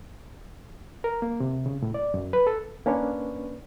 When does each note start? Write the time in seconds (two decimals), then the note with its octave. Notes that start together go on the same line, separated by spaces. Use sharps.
1.04 A#4
1.22 A#3
1.40 C3
1.66 C#3
1.82 A2
1.94 D5
2.14 F#2
2.33 B4
2.47 A4
2.86 A#3 C#4 D4 B4 C#5